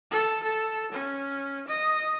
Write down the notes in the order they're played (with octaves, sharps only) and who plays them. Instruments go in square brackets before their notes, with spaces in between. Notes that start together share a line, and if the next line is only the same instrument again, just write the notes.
[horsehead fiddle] A4
A4
C#4
D#5